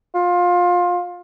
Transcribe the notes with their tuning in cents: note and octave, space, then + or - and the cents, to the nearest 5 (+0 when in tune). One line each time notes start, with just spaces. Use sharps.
F4 +20